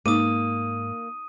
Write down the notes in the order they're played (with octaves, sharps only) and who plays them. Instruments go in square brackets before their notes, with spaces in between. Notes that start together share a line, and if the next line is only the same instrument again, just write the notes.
[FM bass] G#2 [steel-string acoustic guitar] A#3 [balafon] D#4 D6 [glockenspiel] D#6 D#7